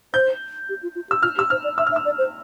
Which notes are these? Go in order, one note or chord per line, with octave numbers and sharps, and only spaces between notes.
C5 G6
G4
F4
F4
G4 E6
F4 F6
G4 E6
C5 F6
D5
E5 E6
F6
E5
E6
D5
C5